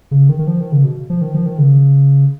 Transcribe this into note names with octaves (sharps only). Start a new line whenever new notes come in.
C#3
D#3
D#3
F3
D#3
C#3
B2
F3
D#3
F3
D#3
C#3